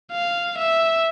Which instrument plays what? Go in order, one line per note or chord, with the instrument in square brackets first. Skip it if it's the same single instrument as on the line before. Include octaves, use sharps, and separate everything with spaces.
[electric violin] F5
E5